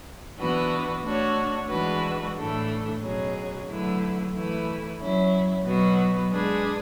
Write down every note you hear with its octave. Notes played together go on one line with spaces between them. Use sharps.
E3 B3 D4 F#4 B4
A3 D4 F#4 C#5
E3 G#3 D4 F#4 B4
A2 E3 A3 D4 A4
B2 F#3 C#4 G#4
D3 F#3 A3 E4 B4
E3 A3 E4 B4
F#3 C#4 E4
B2 F#3 B3 F#4 B4
G#3 D4 G#4 B4